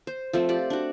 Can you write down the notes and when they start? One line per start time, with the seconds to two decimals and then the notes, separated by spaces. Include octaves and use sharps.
0.07 C5
0.33 F3 A3 C4
0.49 F4 G4 D5
0.70 D4 F#4